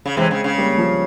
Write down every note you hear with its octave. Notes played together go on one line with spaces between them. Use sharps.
C#3
C3 E3 G#3 C4
C#3
C#3
G3 A#3
F3